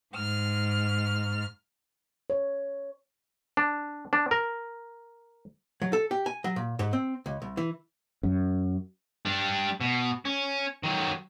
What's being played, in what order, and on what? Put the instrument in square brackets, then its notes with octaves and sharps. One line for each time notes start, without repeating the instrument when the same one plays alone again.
[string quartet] G#2 F6
[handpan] C#5
[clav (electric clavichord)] D4
D4
A#4
[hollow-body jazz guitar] F#3
A4
G4
G#5
F#3
A#2
G#2
C4
C#2
C2
E3
[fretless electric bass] F#2
[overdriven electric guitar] G3 D4
B2
C#4
D#3 F#3